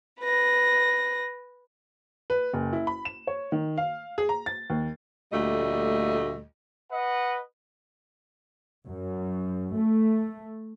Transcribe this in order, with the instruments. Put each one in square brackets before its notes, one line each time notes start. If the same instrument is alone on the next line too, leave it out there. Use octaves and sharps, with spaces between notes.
[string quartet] B4 A#6
[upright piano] B4
F#1
E4
B5
E7
C#5
D#3
F5
G#4
A#5
A6
D#2
[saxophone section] D2 A#2 G3 A3 D#5
[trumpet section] B4 D#5 F#5
[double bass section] F#2
A3